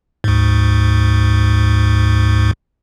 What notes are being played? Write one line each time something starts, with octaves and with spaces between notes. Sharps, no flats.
D2 G#2